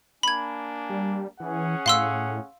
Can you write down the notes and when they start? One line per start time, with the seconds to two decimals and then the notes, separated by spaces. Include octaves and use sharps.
0.23 A#3 D4 G#5 B5 G#6
0.90 G3
1.40 E3 C#4 G#4 F#5
1.86 A2 F5 C6 E6